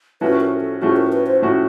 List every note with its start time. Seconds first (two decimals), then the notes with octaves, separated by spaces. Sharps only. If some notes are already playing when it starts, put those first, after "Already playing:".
0.21 A2 F3 A3 C#4 F#4 B4
0.41 A#4
0.61 A4
0.82 A2 F3 A3 C#4 F#4 G#4
0.96 A#4
1.13 B4
1.27 C5
1.42 A2 F3 A3 C#4 F#4